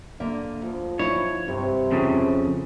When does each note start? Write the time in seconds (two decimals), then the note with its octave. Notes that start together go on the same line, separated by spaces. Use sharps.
0.20 D3 A#3 E5
0.62 D2 F3
0.99 D#4 E4 C#5
1.48 G2 C3
1.92 F2 C#3